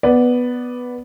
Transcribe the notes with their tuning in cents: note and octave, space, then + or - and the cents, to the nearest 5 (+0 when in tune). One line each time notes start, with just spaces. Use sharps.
B3 +0 D5 +0